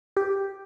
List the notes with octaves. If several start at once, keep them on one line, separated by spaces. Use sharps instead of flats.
G4